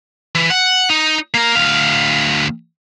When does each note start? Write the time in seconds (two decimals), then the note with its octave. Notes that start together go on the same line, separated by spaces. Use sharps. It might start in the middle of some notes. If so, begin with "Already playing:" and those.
0.35 E3
0.50 F#5
0.90 D#4
1.34 A#3 A#4
1.56 D2 F5